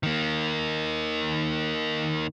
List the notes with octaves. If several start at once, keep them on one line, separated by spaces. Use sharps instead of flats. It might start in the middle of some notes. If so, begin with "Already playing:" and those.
D#3 A#3